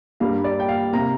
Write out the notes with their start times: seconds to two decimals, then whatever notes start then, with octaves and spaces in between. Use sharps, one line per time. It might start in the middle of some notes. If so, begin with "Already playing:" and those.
0.20 G2 G3 A#3 F5
0.44 D5
0.60 G5
0.69 F5
0.93 C3 A#3 A#5